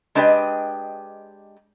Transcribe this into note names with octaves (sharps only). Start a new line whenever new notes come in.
G#3 D4 G4 B4 D#5 G5